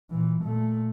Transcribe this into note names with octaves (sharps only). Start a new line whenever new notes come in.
A#2 E3
A#2 A3